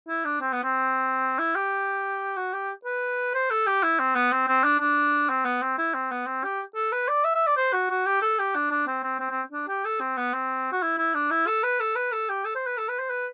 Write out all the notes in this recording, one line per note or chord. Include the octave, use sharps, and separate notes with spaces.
E4
D4
C4
B3
C4
E4
G4
F#4
G4
B4
C5
A4
G4
E4
C4
B3
C4
C4
D4
D4
C4
B3
C4
E4
C4
B3
C4
G4
A4
B4
D5
E5
E5
D5
C5
F#4
F#4
G4
A4
G4
D4
D4
C4
C4
C4
C4
D4
G4
A4
C4
B3
C4
F#4
E4
E4
D4
E4
A4
B4
A4
B4
A4
G4
A4
C5
B4
A4
B4
C5
B4